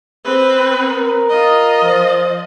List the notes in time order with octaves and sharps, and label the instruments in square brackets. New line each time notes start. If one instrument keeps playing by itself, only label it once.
[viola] C4 B4
[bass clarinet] A#4
[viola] F4 D#5
[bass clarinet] F3